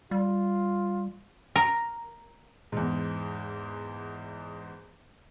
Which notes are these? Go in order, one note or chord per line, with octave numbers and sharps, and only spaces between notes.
G3 F4
A#4
E2 G#2